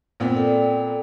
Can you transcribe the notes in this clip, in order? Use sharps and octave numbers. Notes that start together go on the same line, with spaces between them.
A#2 B3 C4
A4 D5 G5